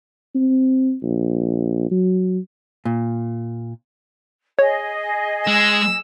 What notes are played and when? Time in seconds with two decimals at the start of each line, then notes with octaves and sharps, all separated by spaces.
0.35 C4
1.03 A#1
1.91 F#3
2.85 A#2
4.59 G#4 C#5 D#5
5.47 G#3 E6